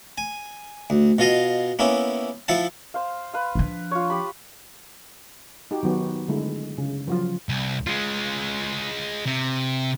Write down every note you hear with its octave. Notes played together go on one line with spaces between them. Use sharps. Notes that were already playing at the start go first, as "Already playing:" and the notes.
G#5
D2
B2 F4 D#5 F5
A#3 B3 C#4 E4
F3 E4 F#5 A5
C5 F5
B4 F5
F3 D4
F4 C#5
G4 B5
D#4 F#4 G4
D#3 F#3 B3 F#4
D3 G#3 A3 E4
C#3
F3 F#3 F4
C2
G#3 F4
C3